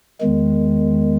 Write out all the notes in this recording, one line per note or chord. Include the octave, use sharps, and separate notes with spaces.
E2 D#3 G#3